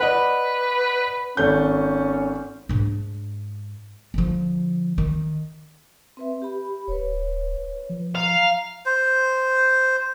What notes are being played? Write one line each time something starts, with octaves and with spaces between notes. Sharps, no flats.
B4 D5 D#5 F#5
G#1 C#4 A4 G6
G#2 D4
D3 F3
D#3
C4 B4 E5
G4 B5
D1 B4 C#5
F3
F5 A#5
C5